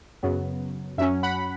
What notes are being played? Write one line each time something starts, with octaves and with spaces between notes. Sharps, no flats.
F#2 C#3 F#3 B3
F#2 F#3 C#4 E5
F#5 B5